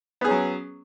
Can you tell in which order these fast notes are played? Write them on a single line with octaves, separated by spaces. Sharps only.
B3 G#4 C#4 F#3